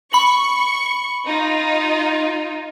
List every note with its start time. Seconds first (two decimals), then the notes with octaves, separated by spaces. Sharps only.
0.13 B5 C#6 F#7
1.26 D#4 F4